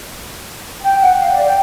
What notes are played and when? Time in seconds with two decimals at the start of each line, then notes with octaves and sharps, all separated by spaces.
0.82 G5
1.01 F#5
1.17 F5
1.31 D5
1.44 G5